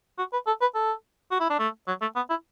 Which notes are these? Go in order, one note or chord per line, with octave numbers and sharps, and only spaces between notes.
F#4
B4
A4
B4
A4
F#4
E4
D4
A3
F#3
A3
B3
E4